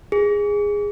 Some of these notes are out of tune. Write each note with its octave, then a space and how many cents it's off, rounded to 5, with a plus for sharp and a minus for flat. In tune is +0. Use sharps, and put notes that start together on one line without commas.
G#4 -10